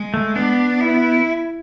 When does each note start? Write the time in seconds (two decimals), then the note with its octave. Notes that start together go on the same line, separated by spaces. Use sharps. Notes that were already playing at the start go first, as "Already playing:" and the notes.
Already playing: G#3
0.14 A3
0.36 B3 D4
0.80 E4